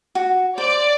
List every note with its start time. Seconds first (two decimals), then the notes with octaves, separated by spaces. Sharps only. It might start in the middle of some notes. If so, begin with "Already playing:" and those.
0.15 F#4
0.58 C5 D5